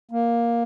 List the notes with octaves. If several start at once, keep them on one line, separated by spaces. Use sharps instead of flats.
A#3